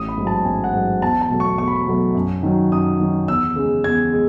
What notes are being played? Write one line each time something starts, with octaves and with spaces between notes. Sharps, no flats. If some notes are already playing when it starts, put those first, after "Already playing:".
Already playing: A1 D#6
B5
G#2 F#3
A5
A1 G#5
F#5
G#2 F#3
E2 A5
A5
B2 F#3 A3
C#6
E2 C#6
B5
C#6
B2 F#3 A3
F#2
D#3 F#3
F#2 D#6
D#3 F#3
E2 E6
C#3 G#3
E2 G#6
G#3